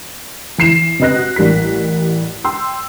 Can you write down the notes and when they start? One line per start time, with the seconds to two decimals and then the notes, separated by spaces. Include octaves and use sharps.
0.58 E3 C7 E7
0.99 C3 B4 D#5 F#6 A#6
1.16 F#4
1.36 A1 G3 A#4 B6
2.44 G5 C6 E6